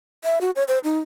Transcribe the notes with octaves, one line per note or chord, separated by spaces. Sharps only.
E5
F#4
C#5
C5
D#4